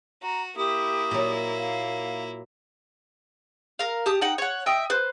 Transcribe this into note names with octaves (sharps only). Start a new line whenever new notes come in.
F#4 A#5
A#3 E4 G4 D#6
A#2 F#3
F5
A#4 F5
G4 A5 D#6
D#4 F#5 G5
C#5 F#5
D#5 E5 G5 D#6
B4 C5